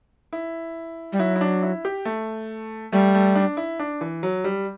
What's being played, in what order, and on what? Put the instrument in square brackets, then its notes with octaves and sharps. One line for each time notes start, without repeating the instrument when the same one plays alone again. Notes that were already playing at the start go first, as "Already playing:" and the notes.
[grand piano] E4
[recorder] G3
[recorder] F#3 [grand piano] E4
[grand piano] E4
D4
E4
G4
A3
[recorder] G3 [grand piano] A3
[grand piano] A3
D4
E4
D4
E3
F#3
G3